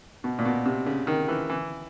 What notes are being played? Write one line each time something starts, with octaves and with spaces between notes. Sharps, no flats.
B2
A#2
B2
C3
C#3
D#3
E3
E3